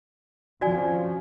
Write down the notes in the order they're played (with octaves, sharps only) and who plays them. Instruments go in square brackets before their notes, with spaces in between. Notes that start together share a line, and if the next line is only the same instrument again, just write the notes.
[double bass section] F2 F3 C#4 [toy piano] F#4 D5 G#5